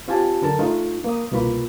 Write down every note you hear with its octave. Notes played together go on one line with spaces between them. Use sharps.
C4 F4 G4 G#5 A5
F#2 D3 A#4 A5
A3 D4 D#4 F4
A#3 D#6
C2 B2 A#3 F4 B5